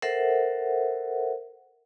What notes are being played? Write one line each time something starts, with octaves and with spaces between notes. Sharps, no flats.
A4 A#4 C5 E5 F#5